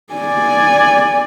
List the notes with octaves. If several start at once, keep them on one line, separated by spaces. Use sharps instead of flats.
D5 G#5